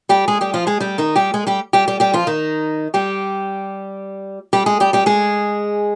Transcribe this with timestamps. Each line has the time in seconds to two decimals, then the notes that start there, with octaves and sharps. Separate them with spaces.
0.09 G3 G4
0.28 G#3 G#4
0.41 G3 G4
0.54 F3 F4
0.67 G#3 G#4
0.80 G3 G4
0.98 D#3 D#4
1.16 G3 G4
1.34 G#3 G#4
1.47 G3 G4
1.73 G3 G4
1.88 G3 G4
2.00 G3 G4
2.13 F3 F4
2.27 D#3 D#4
2.94 G3 G4
4.53 G3 G4
4.66 G#3 G#4
4.80 G3 G4
4.93 G3 G4
5.06 G#3 G#4